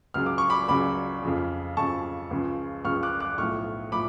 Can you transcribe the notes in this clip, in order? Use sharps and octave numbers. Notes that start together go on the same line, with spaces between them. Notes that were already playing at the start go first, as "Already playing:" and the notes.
C#2 C#3 F#3 F6
D6
C#6
B5 D6
C#2 C#3 F#3 B5 D6
F2 C#3 F3
F2 C#3 F3 A5 C#6
C#2 C#3 F3
C#2 C#3 F3 C#6 F6
D6 F#6
D6 F#6
B1 A2 F3 C#6 F6
A2 F3 B5 D6